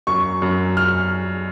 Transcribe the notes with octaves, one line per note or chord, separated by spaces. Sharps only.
F#2 C#6
F#2
F6